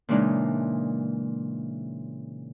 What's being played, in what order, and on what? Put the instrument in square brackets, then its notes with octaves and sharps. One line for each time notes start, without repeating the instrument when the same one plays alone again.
[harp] A#2 C#3 E3 G#3 D4 D#4